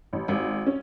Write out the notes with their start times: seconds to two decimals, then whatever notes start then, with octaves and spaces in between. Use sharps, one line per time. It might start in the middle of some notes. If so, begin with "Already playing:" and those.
0.13 A1
0.28 G#1
0.67 C#4